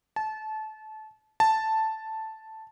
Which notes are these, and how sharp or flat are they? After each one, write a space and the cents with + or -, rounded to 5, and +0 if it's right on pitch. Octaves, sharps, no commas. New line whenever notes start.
A5 -25
A5 +0